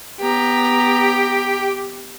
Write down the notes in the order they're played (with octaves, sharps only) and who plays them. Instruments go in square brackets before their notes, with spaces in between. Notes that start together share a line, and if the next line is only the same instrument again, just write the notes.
[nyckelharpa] B3 A#5 [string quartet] G4